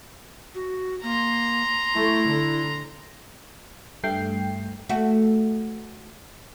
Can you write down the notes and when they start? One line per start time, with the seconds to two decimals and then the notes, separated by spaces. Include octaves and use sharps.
0.55 F#4
1.03 A#3 A#5 C6
1.94 A3 E4
2.28 D3
4.04 G2 A3 G5 C7
4.89 A3 F#4